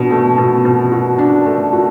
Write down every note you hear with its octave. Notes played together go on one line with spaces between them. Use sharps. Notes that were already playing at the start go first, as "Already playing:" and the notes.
Already playing: B2 D4
A3
B2
B2
F#4
D4
A3
F#4